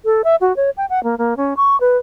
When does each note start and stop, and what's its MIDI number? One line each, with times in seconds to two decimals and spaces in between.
0.05 0.22 69
0.24 0.36 76
0.41 0.55 66
0.56 0.70 73
0.77 0.86 79
0.90 1.03 78
1.04 1.15 58
1.18 1.37 58
1.37 1.54 61
1.57 1.79 85
1.80 1.97 71